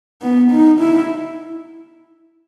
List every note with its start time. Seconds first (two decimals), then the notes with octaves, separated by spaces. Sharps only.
0.22 B3
0.51 D#4
0.80 E4